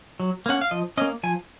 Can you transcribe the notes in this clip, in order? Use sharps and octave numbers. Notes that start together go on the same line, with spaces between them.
F#3
A#3 C#4 F#5
F5
F3 D#5
A#3 C#4 D#5
F3 G#5